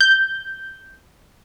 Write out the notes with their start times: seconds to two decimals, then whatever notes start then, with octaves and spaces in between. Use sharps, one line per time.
0.01 G6